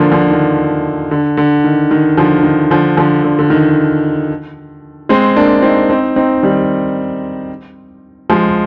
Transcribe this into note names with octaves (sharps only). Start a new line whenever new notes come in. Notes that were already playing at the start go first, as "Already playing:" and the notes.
Already playing: D3 F3 A#3 D4
D3 F3
D#3
D3
D3
D#3
D#3
D3 F3
D#3
D3 F3
D3 F3
D3
D3
D#3
G#3 C4
A#3 D4
C4 D#4
C4 D#4
C4 D#4
D#3 G3
F3 G#3